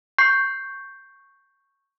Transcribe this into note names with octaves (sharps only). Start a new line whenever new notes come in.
C#6 G6 C7